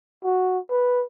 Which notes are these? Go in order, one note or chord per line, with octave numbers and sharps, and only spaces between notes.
F#4
B4